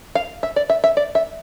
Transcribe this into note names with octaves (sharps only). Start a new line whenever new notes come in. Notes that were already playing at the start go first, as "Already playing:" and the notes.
F5
E5
D5
E5
E5
D5
E5